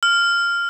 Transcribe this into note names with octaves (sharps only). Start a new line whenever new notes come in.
F6